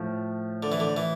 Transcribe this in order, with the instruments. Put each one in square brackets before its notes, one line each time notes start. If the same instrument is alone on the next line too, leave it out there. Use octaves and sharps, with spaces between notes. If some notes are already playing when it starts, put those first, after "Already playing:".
Already playing: [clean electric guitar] A2 F3 A3
[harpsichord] D3
E3
D3
E3